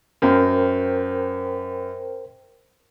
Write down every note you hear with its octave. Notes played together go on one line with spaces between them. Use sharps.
F#2 A#4 C5 G5